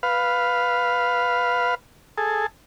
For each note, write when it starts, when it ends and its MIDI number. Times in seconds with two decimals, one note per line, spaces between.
0.03 1.75 71
0.03 1.75 77
2.18 2.46 68
2.18 2.46 69